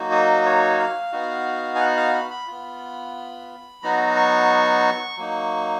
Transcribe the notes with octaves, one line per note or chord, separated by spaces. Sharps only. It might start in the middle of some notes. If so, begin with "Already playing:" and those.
Already playing: F#3 A#3 D#4 F#4
D#5
C#5
F5
B3 D#4 F#4
G#5
F#5
F5
B5
B5
B3 F4
F#3 B3 D#4 F#4 A#5
C#6
F#3 A#3 D#4